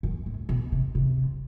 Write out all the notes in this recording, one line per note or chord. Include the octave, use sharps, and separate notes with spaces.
F#2
A2
B2
C3
C3